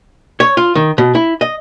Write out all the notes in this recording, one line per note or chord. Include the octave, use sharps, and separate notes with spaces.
C#5
F4
D#3
B2
E4
D#5